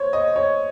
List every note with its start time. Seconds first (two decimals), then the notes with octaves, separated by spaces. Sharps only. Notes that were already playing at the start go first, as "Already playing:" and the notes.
Already playing: C5 C#5
0.13 D#5
0.36 C#5